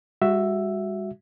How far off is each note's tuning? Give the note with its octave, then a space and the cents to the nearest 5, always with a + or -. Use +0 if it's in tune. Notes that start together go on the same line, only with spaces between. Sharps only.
G3 +45 F#4 +0 E5 +5